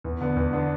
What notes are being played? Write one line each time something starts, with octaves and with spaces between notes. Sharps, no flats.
E2
D3 B3 D4
E2
D3 B3 D4